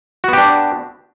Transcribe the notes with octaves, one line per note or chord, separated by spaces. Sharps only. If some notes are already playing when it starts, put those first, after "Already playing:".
B3 D4 F#4 G4